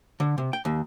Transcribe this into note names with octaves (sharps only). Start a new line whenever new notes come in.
D3
C3
G5
D#2